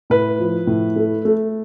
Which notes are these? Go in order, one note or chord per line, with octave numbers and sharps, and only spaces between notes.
A2 B4
F3
A2
A3
A3